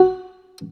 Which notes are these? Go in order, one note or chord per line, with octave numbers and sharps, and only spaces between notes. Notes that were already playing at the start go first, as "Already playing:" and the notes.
Already playing: F#4